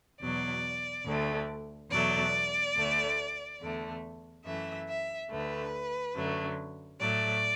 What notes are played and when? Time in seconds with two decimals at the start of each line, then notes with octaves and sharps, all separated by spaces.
0.21 E2 B2 F#3 D5
1.06 D2 D3 A3
1.90 E2 B2 F#3 A3 D5
2.75 D2 D3 A3
3.60 E2 D3 A3
4.45 F#2 E3 A3 E5
4.87 E5
5.30 D2 D3 A3 B4
6.15 F#2 D3 F#3 A3
7.00 A2 F#3 A3 D5